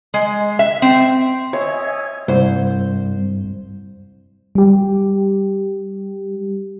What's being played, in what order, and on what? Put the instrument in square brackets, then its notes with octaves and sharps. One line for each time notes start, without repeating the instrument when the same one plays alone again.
[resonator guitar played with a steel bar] G#3
E5
C4
[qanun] C#5 [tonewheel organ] D#5 E5 G#5
[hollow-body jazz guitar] C2 [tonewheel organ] G2 [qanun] C5
[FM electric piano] G3 G4